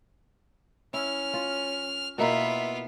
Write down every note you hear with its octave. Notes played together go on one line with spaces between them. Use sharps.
C#4 E4 F6
F4
B2 A#3 B3 E4 F4 E5